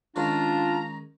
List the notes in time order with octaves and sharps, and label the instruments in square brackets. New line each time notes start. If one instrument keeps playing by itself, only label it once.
[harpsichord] D#3 G#3 C#4 [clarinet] D4 [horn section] F4 [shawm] A#5